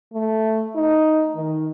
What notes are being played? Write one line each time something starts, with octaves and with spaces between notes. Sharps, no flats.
A3
D#4
D#3